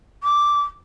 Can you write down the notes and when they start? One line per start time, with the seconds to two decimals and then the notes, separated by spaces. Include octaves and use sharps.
0.24 D6